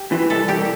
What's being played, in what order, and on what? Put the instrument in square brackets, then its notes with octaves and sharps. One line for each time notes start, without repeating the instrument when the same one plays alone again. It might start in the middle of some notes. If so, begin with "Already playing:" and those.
Already playing: [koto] G4
[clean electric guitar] E3
[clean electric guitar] C2 [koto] A4
[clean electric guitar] C2 [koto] G4